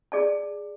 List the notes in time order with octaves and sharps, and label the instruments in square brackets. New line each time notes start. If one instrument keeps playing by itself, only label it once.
[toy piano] G#4 D5 A5